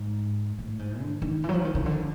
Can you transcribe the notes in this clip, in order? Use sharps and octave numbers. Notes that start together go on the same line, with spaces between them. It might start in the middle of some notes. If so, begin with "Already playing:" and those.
Already playing: G#2
A2
G#2
D3
D#3
E3
F#3
F3
D#3
C#3
D3